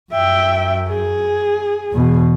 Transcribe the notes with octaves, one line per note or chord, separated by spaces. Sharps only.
F#2 E5 G5
G#4
E2 B2